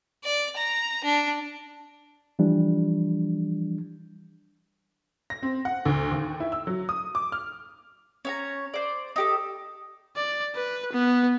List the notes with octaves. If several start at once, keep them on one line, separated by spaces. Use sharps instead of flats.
D5
A#5
D4
E3 F3 G3 D4
A#6
C4
F#5
D2
D#2
E4
E6
F#3
D#6
D6
F6
C#4 C#5 A#5
C5 D5
D#4 G4 A4
D5
B4
B3